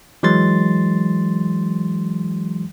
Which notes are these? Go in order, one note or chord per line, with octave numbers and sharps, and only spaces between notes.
E3 F#3 G#3 C6 A6